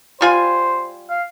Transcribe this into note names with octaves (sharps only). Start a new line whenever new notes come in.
G3 F4 C5 G#5
F5